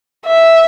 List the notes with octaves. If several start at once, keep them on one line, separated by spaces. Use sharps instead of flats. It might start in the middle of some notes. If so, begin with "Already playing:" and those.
E5